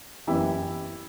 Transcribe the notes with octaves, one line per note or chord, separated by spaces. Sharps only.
F#1 F#2 E3 E4 G4